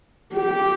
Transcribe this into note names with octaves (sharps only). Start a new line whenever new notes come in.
G4